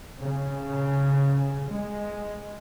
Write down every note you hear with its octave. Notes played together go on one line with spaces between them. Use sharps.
C#3
G#3